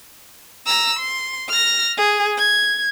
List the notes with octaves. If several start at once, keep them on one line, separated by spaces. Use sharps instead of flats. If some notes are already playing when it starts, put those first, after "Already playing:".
A#5 E6
C6
F6 A#6
G#4
G#6